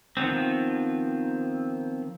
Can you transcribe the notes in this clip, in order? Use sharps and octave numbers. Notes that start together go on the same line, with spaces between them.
D#3 F3 B3 C4